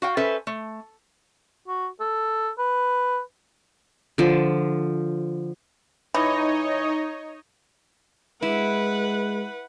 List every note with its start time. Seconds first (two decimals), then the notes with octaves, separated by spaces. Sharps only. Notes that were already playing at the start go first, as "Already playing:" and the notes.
0.02 F#4 F5 G5
0.17 C#4 A4 B4 C5 E5
0.47 A3
1.68 F#4
2.00 A4
2.58 B4
4.18 D3 F3
6.14 E3 D#4 C#5 D#5
8.42 G#3 E4 B4 F#5